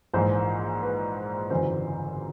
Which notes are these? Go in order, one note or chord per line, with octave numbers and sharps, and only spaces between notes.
A#1 G#2 E3 C5
B4
G1 F#2 C#3 E3 C5